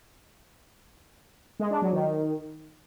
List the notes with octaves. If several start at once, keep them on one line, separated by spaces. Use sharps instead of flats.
G#3
D4
F#3
D#3